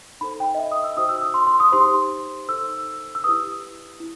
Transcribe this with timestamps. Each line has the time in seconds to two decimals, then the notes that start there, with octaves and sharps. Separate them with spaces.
0.21 D#4 A4 C5 B5
0.40 G5
0.55 D#5
0.59 E5
0.72 D#6
0.84 E6
0.96 D#4 F#4 C5 D#6
1.09 E6
1.22 D#6
1.34 C6
1.47 C6
1.60 D#6
1.72 D#4 G4 C5 C6
2.48 D#4 A4 C5 E6
2.70 E6
3.15 E6
3.24 E4 G4 B4 D#6
4.00 E4